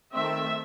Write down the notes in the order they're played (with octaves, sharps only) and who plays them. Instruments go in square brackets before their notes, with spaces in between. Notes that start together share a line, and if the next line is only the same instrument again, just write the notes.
[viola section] D#3 A3 C4 E5